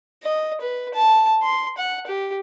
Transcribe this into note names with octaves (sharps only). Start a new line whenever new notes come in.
D#5
B4
A5
C6
F#5
G4